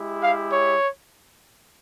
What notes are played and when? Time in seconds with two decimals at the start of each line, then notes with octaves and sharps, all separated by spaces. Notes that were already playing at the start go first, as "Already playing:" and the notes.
Already playing: G#3 E4 G4
0.23 F5
0.52 C#5